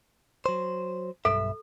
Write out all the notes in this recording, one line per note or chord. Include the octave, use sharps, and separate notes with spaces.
F#3 C5
B1 G2 A4 E5